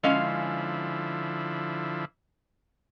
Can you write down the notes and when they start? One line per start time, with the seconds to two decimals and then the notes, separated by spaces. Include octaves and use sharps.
0.03 D3 F3 G#3 C#4 E4 F5